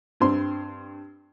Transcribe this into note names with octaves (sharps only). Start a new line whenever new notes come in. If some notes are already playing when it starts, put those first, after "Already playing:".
G2 C4 C6